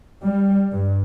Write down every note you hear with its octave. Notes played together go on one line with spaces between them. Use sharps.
G3
G2